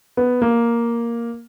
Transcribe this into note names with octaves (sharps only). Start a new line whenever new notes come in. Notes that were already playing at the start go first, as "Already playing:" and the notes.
B3
A#3